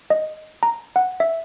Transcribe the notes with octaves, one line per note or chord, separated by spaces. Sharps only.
D#5
A#5
F#5
E5